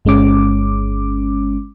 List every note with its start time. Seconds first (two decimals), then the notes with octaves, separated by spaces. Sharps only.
0.05 G1 G#3 C#4 D6